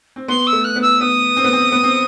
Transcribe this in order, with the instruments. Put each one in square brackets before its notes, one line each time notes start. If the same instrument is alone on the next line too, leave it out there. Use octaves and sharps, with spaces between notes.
[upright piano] C4
[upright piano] B3 [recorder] C6
[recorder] E6
[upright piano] A3
[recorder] F#6
[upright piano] B3
[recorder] E6
[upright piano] B3 [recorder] D#6
[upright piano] C4
B3
C4
B3
C4